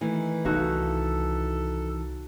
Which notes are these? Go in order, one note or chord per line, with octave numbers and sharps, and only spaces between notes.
D#3 E3 A3
C2 D#4 F#4 A4